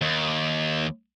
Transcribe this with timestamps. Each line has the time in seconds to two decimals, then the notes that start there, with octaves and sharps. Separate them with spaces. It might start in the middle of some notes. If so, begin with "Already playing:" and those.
0.02 D#2